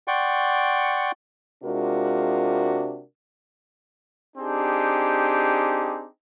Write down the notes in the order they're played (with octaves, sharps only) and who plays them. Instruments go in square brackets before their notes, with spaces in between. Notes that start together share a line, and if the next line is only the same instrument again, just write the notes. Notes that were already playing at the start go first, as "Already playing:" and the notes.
[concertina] D5 F#5 G5 C6 C#6
[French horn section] C3 G#3 D4 F4 F#4 A#4
[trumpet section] C4 D4 D#4 G4 G#4